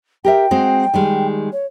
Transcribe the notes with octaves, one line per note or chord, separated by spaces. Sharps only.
G4 A#4 E5 G5
G#3 C4 F#4
D#3 G3 G#3
C#5